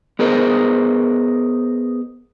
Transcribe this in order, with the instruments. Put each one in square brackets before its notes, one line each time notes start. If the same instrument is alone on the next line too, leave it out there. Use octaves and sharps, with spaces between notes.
[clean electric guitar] B3 G#4 A#4 C5 D#5